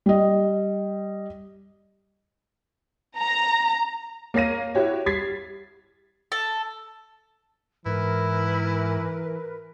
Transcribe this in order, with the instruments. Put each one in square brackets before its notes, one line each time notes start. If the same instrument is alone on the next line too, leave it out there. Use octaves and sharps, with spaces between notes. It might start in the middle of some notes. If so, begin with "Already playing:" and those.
[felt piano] G3 D#5
[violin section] A#5
[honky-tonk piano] A#3 C#5 F5 A#6 D#7
E4 F#4 G4 C#5
G3 G#6 A6 B6 C7
[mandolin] A4
[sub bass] G#2 [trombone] E3 [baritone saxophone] E4 [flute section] A#4 B4